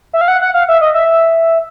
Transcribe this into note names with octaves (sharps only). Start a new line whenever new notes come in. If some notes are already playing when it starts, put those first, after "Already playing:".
E5
F5
F#5
F#5
F5
E5
D#5
E5